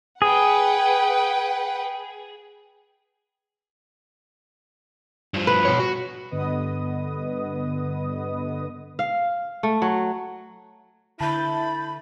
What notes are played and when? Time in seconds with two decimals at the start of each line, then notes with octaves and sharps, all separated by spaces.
0.22 G#4 B4 F#5 G5
5.34 G2 F3
5.47 B4
5.65 B2 C#5
5.79 F#4
6.31 G2 D3 B3 B4 D#5 D#6
8.99 F5
9.63 A3
9.82 F#3
11.20 D3 E4 A5 B5 G6 A6